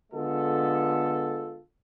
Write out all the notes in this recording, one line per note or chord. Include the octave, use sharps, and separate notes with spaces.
D3 G#3 B3 F4 A4